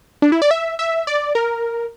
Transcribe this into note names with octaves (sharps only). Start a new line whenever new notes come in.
D4
E4
D5
E5
E5
D5
A#4